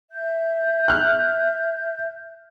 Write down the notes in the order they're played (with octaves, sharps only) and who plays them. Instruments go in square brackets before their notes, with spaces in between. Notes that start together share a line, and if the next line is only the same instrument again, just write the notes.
[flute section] E5 G6
[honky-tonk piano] F6 F#6